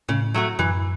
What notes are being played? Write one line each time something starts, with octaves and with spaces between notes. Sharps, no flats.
A2 C#3
F#3 A3 F#4
F#2 E3